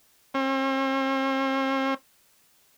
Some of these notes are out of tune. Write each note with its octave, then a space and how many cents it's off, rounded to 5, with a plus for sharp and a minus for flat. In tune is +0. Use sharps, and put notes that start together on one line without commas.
C4 +45